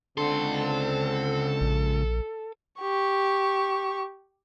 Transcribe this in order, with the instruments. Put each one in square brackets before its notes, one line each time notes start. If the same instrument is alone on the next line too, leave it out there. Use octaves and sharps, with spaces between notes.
[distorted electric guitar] C#2 C6 [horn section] D3 C4 [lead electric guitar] A4
[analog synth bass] A#1
[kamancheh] G4 C#6